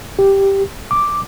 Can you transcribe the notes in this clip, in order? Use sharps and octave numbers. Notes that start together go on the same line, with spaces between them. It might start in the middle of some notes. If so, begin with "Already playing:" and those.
G4
D6